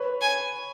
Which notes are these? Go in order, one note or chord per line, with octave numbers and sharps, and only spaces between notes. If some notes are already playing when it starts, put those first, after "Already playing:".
Already playing: B4 C#5
G#5